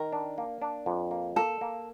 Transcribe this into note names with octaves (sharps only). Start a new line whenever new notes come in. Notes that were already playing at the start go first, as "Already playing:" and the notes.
Already playing: D#3 A#4
D4
A#3
D4
F2
A#3
A#3 A4
A#3